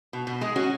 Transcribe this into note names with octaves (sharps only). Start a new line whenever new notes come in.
B2
B2
G#3 G#4
C#4 F#4